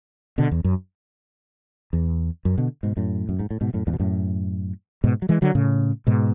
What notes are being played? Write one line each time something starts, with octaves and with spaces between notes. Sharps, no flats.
B2 D3
E2
F#2
E2
F#2
B2 D3
G#2 B2
F#2 A2
F#2
G#2
A2
G#2 B2
F#2 A2
E2 G#2
B2
F#2 A2
G#2 B2
F#3
E3 G#3
D3 F#3
A2 C#3
G#2 B2